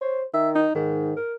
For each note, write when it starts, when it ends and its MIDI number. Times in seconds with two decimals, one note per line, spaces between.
0.01 0.22 72
0.01 0.21 73
0.34 0.66 51
0.34 0.50 76
0.55 0.74 63
0.75 1.14 44
0.75 1.12 51
1.16 1.36 70